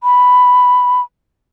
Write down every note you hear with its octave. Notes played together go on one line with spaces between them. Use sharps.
B5